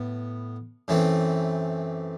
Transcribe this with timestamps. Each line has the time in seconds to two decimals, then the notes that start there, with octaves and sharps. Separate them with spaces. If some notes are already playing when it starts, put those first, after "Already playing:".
Already playing: A2 B3
0.88 F#2 E3 A3 C4